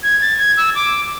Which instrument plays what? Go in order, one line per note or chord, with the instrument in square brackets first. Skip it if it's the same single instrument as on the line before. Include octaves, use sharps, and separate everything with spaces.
[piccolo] G#6
A6
G#6
E6
D6